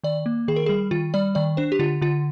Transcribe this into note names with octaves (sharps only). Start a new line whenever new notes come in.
D#3 D5
A#3
D#3 G#4
A#4
G#4
G3
D#3 F4
G3 D5
D#3 D5
D4 C5
G4
D3 F4
D3 F4